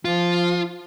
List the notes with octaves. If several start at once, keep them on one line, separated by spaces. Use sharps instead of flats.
F3 F4